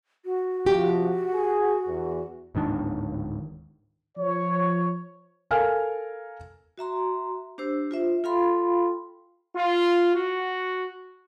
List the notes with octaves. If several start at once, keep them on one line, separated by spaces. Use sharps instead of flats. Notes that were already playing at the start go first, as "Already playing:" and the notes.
F#4
C3 F3 G4
G#4
E2
D1 G#2 D#3 D4
F3 C#5
A4 A#4 F5 G#5 F6
F#4 E5 A#5 C6
D4 G4 C5 E6
F4 C5 E5
F4 A4 F5 G5 B5 C6
F4
F#4